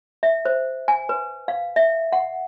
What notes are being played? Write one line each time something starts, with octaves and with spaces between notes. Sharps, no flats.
E5
C5
G#5
B4
F5
E5
F#5